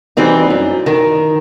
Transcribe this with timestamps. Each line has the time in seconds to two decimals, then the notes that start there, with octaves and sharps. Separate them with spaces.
0.17 E3 G3 C4 D#4
0.50 F#2
0.86 D#3